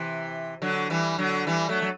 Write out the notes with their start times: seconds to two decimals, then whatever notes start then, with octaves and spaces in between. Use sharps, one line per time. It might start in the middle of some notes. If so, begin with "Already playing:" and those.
Already playing: C3 E3
0.62 D3 F#3
0.90 E3 G3
1.18 D3 F#3
1.47 E3 G3
1.69 F#3 A3
1.82 F#3